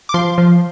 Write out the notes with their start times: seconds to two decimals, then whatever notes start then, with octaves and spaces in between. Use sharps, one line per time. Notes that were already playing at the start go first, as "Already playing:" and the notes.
0.09 D6
0.14 F3 C6
0.38 F3